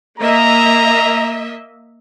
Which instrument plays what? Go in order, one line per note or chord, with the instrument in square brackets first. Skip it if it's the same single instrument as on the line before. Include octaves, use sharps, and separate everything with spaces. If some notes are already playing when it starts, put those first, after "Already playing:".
[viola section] A#3 D#5 E5 [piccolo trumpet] A#5